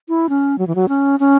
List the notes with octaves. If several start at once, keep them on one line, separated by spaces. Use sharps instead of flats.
E4
C#4
F#3
E3
F#3
C#4
C#4